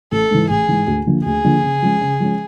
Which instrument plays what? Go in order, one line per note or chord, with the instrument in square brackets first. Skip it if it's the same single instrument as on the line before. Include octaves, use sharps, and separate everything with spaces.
[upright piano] A1 [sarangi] A4
[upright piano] G#2 E3
[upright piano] A1 [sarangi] G#4
[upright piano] G#2 E3
D2
D3 F3 A#3
[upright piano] D2 [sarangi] G#4
[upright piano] D3 F3 A#3
C#3
F3 G#3 C#4
C#3
F3 G#3 C#4